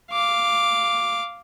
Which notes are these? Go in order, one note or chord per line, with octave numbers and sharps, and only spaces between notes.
F5 D6